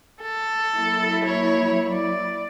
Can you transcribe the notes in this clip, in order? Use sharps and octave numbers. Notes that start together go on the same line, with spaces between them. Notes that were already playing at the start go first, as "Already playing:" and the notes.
A4
F#3 A#3 E4
C#5
D5